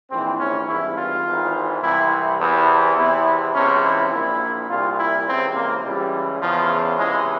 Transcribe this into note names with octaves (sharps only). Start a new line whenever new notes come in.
A#1 G#2 E3 C4
C#4
G#1 G2 E3 E4
F4
G#1 G#2 E3
C2 C3 E3 E4
E2 C3 E3
E2 C3 E3 E4
C#2 C3 E3 C#4
E4
A#1 A#2 E4
C2 A#2 F4
E4
C#2 C3 E3 C4
A#3
C#2 C#3 E3 G3
E2 C#3 E3 F3
C#2 C3 E3 G#3